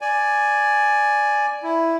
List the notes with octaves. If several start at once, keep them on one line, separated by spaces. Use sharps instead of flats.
D5 G#5
E4